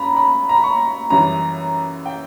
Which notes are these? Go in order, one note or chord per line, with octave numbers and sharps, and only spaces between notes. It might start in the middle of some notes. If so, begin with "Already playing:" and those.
Already playing: F#2 A#5 B5
B5
A#5
B5
C#6
F#2 E3 G3 A#5
G5